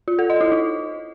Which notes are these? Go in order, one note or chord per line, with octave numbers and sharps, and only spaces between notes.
F4
A4
D#5
E4
D#4